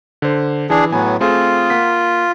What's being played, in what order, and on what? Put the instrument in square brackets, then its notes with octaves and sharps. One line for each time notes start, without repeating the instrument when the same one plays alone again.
[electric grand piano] D3 C5
[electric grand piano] E3 [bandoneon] D4 G#4
[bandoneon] A2 F#3 B3 [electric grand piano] G#5
[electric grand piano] A3 C4 G#4 [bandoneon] F4
[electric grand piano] A#3 F#5 B6